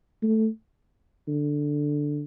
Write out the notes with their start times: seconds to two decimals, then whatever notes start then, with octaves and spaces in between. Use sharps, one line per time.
0.22 A3
1.28 D3